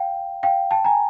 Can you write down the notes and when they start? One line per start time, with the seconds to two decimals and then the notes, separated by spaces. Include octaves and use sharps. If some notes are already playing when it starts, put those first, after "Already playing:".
Already playing: F5 G5
0.43 F5 G5
0.71 G5 A5
0.84 G#5 A#5